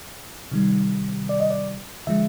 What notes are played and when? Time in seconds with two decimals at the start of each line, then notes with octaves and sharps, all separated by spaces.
0.52 C3 D#3 G3
1.29 D5
1.40 D#5
1.51 D5
2.07 D3 F3 G#3 E5